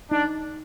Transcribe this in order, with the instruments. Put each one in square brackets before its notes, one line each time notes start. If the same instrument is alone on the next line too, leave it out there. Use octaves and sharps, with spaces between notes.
[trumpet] D4 [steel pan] D#4